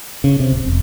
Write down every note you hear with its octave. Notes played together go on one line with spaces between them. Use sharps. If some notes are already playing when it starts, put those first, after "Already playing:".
C#3
C3
D1
E1